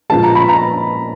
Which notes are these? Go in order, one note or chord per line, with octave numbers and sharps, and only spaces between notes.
A#2 F3 G#3 A5
A#5
B5
A#5